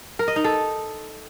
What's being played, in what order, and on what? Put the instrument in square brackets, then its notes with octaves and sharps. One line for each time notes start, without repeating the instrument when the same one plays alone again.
[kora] A#4
D#5
D#4
A4